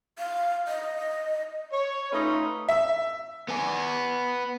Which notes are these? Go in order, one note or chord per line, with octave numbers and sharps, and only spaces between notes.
F5
D#5
C#5
A3 C#4 D#4 F4 B4
E5
B3 G#5